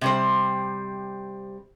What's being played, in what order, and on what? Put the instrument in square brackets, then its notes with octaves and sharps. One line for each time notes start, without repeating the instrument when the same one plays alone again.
[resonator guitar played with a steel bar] C3 G3 C5